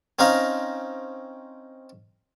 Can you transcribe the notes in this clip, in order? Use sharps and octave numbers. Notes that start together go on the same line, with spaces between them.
C4 C#4 D#4 F5 A#5